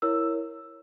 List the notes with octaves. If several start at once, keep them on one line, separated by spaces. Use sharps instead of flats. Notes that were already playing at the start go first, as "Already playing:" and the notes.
E4 A#4 C#5 E6